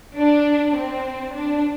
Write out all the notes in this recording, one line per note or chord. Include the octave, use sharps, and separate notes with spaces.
D4
C4
D4